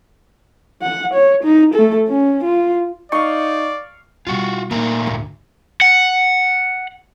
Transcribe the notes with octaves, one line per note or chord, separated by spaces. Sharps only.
F#5
C#5
D#4
A3 A4
C#4
F4
D#4 D5 F5 C#6
B2 G3 F4 F#4
A#2 A3 A#3 D#4 A#4
G#1 D2
F#5